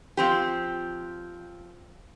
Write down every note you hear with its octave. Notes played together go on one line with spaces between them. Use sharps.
F3 C4 G4